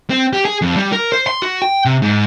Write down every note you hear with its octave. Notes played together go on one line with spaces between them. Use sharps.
C4
G4
G#4
F2
G3
A#4
C5
C6
F#4
G5
C3
G#2